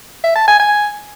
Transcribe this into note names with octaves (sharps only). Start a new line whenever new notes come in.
E5
A5
G#5
G#5